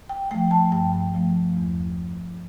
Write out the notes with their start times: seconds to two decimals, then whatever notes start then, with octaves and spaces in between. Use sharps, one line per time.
0.09 G5
0.31 F3 A3 G5
0.51 A5
0.72 G2 G5
1.15 F3 A3
1.57 E2